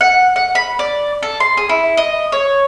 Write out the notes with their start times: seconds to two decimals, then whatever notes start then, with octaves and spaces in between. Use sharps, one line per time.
0.01 F#5
0.36 F#5
0.55 B5
0.79 D5
1.23 A4
1.40 C6
1.57 G#4
1.69 E4
1.97 D#5
2.32 C#5